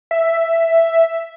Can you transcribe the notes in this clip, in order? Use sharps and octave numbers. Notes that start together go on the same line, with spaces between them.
E5